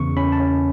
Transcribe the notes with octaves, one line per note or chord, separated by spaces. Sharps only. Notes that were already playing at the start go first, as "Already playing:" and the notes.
Already playing: E2 C#3 C#6
C#4 B5
A5
C#4